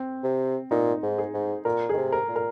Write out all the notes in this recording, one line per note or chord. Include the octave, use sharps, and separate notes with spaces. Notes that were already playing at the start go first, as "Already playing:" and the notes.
Already playing: C4
C3
A#2 D#4
G#2
G#4
G#2
A#2 A#4
D#3 G#4
C3
A#4
A#2
A#4